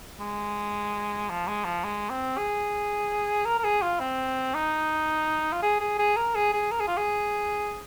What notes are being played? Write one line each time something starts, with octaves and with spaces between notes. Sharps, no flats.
G#3
F3
G#3
F3
G#3
C4
G#4
A#4
A#4
G#4
F4
C4
D#4
F4
G#4
G#4
G#4
A#4
G#4
G#4
A#4
G#4
F4
G#4